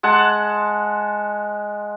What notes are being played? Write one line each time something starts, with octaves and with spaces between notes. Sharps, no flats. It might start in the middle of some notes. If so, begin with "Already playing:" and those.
G#3 F#5 A5